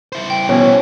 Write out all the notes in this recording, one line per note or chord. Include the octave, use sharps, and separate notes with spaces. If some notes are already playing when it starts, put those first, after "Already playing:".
E4 C5
G5
B2 E3 C#4 C#5